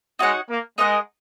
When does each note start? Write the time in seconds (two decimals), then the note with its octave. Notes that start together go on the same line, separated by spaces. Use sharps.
0.19 G#3 D#4 F#4 C#5 F#5
0.48 A#3
0.78 G#3 D#4 A#4 D#5 F#5